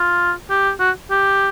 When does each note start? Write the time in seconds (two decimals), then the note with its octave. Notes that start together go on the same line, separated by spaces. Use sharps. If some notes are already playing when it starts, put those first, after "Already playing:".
Already playing: F4
0.50 G4
0.80 F#4
1.11 G4